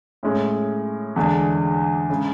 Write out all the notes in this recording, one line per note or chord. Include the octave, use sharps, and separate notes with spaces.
A2 G#3 C#4
E2 D3 G#3 D4
C#3 G#3